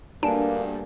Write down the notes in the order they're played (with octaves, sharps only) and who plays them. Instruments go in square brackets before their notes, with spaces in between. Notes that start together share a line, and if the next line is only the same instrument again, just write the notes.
[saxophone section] D2 G2 [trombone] A#3 [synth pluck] D4 [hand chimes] D5 G#5